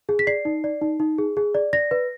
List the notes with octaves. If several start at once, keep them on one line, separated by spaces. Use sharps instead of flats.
G#4
B6
D5 C7
D#4
D5
D#4
D#4
G#4
G#4
D5
D5 A#6
B4